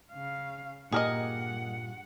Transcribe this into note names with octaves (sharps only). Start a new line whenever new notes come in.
C#3 F5
G2 A#2 G4 G#4 A#4 D#5 F#5